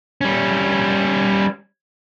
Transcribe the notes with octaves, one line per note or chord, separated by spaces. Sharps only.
G3 C#4